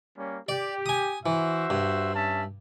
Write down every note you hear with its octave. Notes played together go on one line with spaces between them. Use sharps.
G3 A#3 C#4
G4 D5
G#5 D#6
E3 F#4 C5 E5
G2
C#4 E5 A5